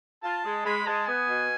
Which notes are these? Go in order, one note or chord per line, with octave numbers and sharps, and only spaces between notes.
F4 A5
G#3
G#3 B5
G#3 A5
B3 G#5
B2